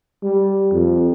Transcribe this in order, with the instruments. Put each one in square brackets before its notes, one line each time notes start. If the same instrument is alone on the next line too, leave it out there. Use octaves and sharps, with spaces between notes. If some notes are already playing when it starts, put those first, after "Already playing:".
[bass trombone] G3
F2